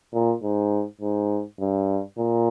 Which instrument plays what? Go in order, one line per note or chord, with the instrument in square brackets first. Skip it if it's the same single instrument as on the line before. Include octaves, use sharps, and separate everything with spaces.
[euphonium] A#2
G#2
G#2
G2
A#2